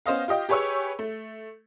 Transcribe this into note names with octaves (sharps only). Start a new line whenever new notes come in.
B3 C#4 C5 D#5 F5
F4 G4 D#5 G5
G4 G#4 B4 C#5 C#6 E6
A3